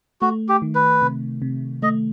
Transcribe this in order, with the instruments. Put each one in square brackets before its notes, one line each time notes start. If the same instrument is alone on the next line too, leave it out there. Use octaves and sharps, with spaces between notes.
[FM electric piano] A3 [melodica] F#4
[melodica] G4
[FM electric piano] D#3
[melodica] B4
[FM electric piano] C3
C3
[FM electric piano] A3 [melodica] D#5